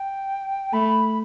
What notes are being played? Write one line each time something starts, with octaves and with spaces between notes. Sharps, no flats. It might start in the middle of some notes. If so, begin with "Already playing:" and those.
Already playing: G5
A3 B5